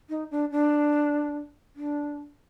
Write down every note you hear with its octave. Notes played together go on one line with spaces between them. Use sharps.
D#4
D4
D4
D4